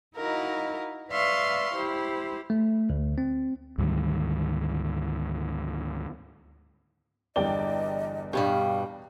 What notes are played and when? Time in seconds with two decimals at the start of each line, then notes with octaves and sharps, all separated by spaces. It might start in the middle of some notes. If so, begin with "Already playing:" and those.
0.15 D#4 E4 F#4 A#4 D#5 F5
1.11 B4 D5 E5 F5 C6 C#6
1.74 E4 G4 C5
2.50 A3
2.90 D2
3.18 C4
3.78 D2 G#2 D#3 G3
7.36 G1 E2 G3 D5 D#5 G5 G7
8.33 G2 B2 G3 D4 G4 F5